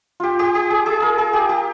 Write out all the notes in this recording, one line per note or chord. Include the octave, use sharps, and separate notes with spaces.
F4 G4
G4
G4
G#4
G#4
A#4
G#4
G4
G4